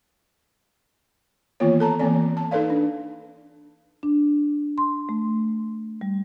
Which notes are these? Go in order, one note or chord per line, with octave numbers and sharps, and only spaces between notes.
D#3 E3 A#3 B3 F4 C#5
A4 A5 A#5
E3 A#3 C4 D5
A5
D#4 A4 B4 D5 F5
D4
D4
C6
A3
G3